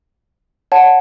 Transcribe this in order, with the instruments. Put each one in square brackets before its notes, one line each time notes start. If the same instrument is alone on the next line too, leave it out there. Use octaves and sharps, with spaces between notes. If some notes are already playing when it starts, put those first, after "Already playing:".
[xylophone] C#5 F#5 A5